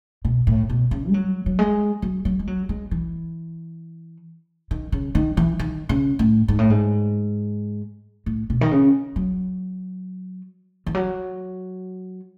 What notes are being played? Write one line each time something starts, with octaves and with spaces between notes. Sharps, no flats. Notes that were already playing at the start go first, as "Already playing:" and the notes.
B2
A2
B2
C#3
G#3
F#3
F#3
G#3
F#3
F#3
G#3
F#3
G#3
E3
D#3
C#3
D#3
E3
D#3
C#3
A2
G#2
A2
G#2
A2
B2
D#3
C#3
F#3
E3
F#3